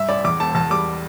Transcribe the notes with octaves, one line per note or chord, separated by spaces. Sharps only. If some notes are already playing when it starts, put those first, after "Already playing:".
Already playing: G2 E5
A1 D5
E2 D6
E1 A5
E2 A5
G3 D6